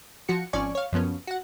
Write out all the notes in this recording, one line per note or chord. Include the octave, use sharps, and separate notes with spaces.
F3 F#4 C#7
G#1 F3 C#4 D5 G#5 C#6
C#5 F5
F#2 F3 B3 C#4
F#4 F#5